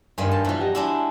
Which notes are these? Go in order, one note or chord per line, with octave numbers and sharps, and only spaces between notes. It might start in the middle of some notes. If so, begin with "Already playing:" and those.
G2 D#3 G3 G#3 D#4
A5
B2 E3 F#3 G3 F4
F#4 G4 D#5
G#3 D4 E4